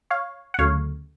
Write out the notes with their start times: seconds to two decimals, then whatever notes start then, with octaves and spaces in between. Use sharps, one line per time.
0.10 C#5 F5
0.54 F#5
0.59 D2 C#3 F#3 A3 C#5 F5